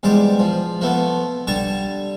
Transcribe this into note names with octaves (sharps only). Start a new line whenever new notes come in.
E2 G#2 G3 C5 D6
F3
F3 A3 B3
D3 G3 A5 C#6